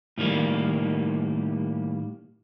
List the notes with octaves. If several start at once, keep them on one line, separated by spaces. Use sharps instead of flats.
A2 D#3 G3 A#3